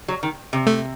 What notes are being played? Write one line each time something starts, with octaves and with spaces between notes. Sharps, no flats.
F#3
D#3
C3
A3